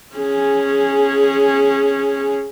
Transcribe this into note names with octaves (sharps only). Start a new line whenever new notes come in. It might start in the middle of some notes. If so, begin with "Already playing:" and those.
C#4 G#4